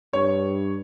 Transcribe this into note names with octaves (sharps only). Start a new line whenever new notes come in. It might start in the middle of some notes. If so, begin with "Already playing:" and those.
G2 C#5